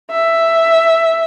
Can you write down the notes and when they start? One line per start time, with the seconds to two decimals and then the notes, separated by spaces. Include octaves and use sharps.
0.11 E5